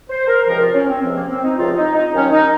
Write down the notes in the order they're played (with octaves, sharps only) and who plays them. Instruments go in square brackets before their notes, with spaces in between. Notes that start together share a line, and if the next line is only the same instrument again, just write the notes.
[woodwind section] C5
A#4
C#2 C3 F3 A#4
F4
C#4
C4
C#2 C3 F3 C4
A#3
C4
D#4
C#2 C3 F3 F4
D#4
D#4
D#2 D#3 F#3 C#4
D#4